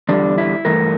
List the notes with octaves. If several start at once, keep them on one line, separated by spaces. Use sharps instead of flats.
E2 D3 G3 D4
E4
G2 E3 A3 A#4